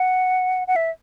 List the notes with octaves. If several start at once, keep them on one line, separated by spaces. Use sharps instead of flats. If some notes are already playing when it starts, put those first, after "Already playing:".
Already playing: F#5
F#5
E5